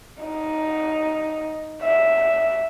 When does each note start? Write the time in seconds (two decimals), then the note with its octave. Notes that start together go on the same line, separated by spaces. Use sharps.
0.23 D#4
1.83 E5